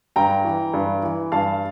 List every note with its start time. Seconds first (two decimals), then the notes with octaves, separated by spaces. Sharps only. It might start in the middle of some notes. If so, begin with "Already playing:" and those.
0.16 G2 G5 A#5
0.45 E3
0.74 G2
1.03 E3
1.32 G2 F5 A5